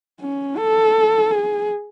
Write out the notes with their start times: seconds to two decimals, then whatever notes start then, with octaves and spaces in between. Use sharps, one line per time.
0.21 C#4
0.57 A4
1.31 G#4